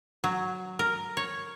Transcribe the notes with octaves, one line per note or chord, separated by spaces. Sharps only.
F#3
A#4
C#5